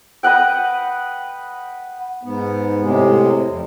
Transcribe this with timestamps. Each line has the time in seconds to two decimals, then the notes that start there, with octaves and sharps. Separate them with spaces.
0.23 B4 D#5 F#5 G5
2.23 G#2 B3
2.81 A2 C3 G#3
3.48 F2